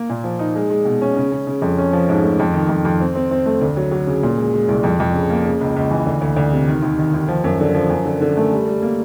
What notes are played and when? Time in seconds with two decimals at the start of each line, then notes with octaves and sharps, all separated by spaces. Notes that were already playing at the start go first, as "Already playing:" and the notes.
Already playing: A#3
0.10 A#2
0.24 F3
0.39 D#4
0.55 G#3
0.70 G#3
0.85 B2
1.02 C#4
1.17 C#3
1.31 C#3
1.47 C#3
1.62 F2
1.78 C#4
1.93 F3
2.09 G#2
2.23 A3
2.39 F2
2.54 D#3
2.69 F2
2.85 F2
3.00 C4
3.15 C4
3.31 C4
3.46 A3
3.61 D2
3.77 F#3
3.91 F#3
4.07 C#3
4.23 A#2
4.38 G#3
4.54 G#3
4.69 C2
4.83 F2
5.00 F2
5.14 C#3
5.30 A#3
5.45 C#3
5.61 C#2
5.76 C#2
5.91 E3
6.07 D2
6.22 D2
6.36 D2
6.52 C3
6.68 D#3
6.83 D#2
6.99 D#3
7.14 D#2
7.28 F3
7.44 F#2
7.60 D3
7.75 F3
7.90 F#2
8.05 D3
8.21 D3
8.37 A3
8.51 G3
8.67 G3
8.82 A#3